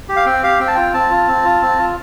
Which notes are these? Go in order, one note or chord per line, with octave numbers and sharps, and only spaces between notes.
G4
F5
C4 G5
G4 F5
C4 G5
A5
F4 G5
C4 A5
F4
C4
F4
C4
F4